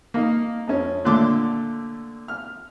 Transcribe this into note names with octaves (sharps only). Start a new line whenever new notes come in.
A#3 D#4
F2 C#4
A#2 D3 A3 C6 D6
F6